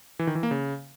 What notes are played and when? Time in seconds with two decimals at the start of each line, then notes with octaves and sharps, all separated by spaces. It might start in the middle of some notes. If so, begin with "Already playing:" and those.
0.19 E3
0.27 D#3
0.35 E3
0.43 A#3
0.51 C#3